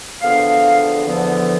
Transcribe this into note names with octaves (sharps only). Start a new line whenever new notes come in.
E2 D3 F3 B3 F5
E2 D3 F3 B3